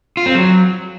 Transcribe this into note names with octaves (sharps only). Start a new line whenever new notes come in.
F4
C4
F#3